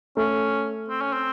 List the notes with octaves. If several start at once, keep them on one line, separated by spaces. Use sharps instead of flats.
A3 C#4
C4
C#4
C4